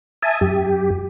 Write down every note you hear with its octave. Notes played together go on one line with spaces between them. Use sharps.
E5 G#5 A5 D#6
F#2 G4